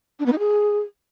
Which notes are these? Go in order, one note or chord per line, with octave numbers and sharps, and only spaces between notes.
D4
B3
D#4
G#4